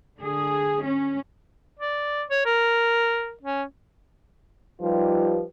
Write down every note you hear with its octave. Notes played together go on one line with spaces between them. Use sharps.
D3 G#4
C#4
D5
C#5
A#4
C#4
F3 G3 D#4 F4 G4 B4